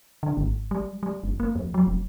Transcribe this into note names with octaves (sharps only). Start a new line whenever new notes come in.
D3
G#1
G3
G3
F#1
A#3
F2
F#3
F1